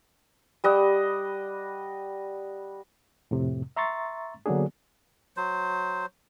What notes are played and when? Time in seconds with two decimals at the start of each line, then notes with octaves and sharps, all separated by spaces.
0.64 G3 D#5 F#5
3.31 F2 A2 C3
3.76 E5 A#5 C6 C#6 A6
4.46 D3 F#3 A#3 B3 D4 G#4
5.37 F#3 C5